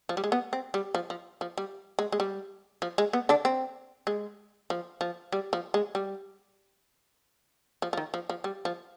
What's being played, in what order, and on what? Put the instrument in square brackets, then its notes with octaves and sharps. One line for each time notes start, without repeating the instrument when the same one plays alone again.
[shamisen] F3
G3
G#3
B3
C4
G3
F3
F3
F3
G3
G#3
G#3
G3
F3
G#3
B3
D3 D4
C4
G#3
F3
F3
G3
F3
G#3
G3
F3
F3
D#3
F3
F3
G3
F3